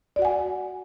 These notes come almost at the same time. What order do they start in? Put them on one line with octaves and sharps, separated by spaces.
D5 F#4 F#5 G#5